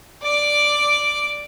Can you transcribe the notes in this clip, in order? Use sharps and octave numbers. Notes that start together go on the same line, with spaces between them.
D5 D6